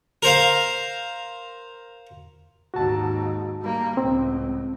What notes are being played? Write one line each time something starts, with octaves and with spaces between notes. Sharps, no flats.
A#4 C5 F5
D#2 G#2 F#4 A5
G3 A#3
C#2 A2 C4